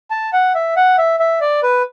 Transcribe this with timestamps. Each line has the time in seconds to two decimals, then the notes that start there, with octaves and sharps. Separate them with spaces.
0.11 A5
0.33 F#5
0.55 E5
0.77 F#5
0.98 E5
1.20 E5
1.41 D5
1.63 B4